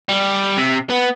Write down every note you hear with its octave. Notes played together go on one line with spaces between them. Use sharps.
G3
C3
B3